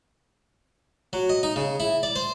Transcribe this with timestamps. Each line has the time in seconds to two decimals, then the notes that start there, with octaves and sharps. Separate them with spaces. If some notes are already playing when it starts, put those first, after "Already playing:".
1.13 F#3
1.29 D#5
1.43 D#4
1.56 C#3
1.80 E4
2.03 D5
2.16 C5